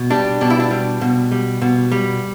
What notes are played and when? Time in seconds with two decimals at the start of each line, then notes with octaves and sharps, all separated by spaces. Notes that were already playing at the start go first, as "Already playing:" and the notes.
Already playing: B2
0.11 G3 D4
0.41 B2 D4
0.50 E4
0.60 D4
0.71 G3
1.01 B2
1.32 G3
1.62 B2
1.92 G3